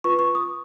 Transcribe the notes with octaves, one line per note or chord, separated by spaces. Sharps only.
F4 B4 C#6
C#6
D#6